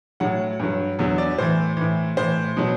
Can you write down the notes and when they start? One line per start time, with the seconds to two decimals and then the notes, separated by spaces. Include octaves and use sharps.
0.20 A2 F#3 F#5
0.60 G2 F#3
0.99 E2 D3 F#3
1.18 D5
1.38 A2 E3 C5
1.77 A2 E3
2.17 A2 E3 C5
2.57 B2 F#3